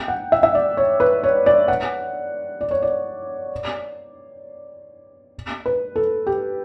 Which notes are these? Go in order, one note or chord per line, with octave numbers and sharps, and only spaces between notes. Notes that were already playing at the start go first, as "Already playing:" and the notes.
Already playing: G5
F#5
E5
E5
D5
C#5
B4
C#5
D5
F#5
D5
C#5
D5
B4
A4
G4